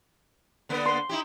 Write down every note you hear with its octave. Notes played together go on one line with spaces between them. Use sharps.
D3 A#3 B3
C6
D#4 E4 G4